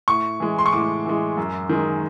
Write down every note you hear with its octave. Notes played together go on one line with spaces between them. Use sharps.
A2 C#6
E3 G#3
C6
C#6
A2 D6
E3 G#3
F#2
D#3 G#3